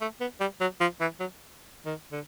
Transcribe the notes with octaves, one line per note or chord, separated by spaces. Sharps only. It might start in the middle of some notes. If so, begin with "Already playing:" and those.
A3
B3
G3
F#3
F3
E3
F#3
D#3
D3